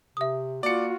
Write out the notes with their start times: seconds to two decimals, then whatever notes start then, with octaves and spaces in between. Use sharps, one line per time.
0.17 C3 E5 D#6
0.63 A#3 F4 F#4 D5 C#7